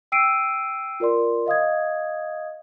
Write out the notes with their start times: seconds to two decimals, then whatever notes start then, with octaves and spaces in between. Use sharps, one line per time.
0.12 G5 E6 C7 D7 D#7
1.00 F4 A#4 D5 C6
1.46 D#5 F5 D#6 G#6